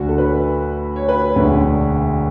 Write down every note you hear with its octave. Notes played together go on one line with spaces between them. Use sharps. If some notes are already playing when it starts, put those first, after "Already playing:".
Already playing: D2 D3 F#4
A4
B4
C#5
B4
E1 D2 D3